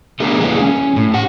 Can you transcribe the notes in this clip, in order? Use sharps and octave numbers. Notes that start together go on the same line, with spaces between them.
A3 B3 D4 G4 G#4 A#4
E2 G#3 A#3 C4 E4 B4
C#4
A2
G4 F#5